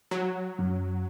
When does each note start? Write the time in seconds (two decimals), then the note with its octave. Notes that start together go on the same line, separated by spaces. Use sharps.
0.11 F#3
0.58 F#2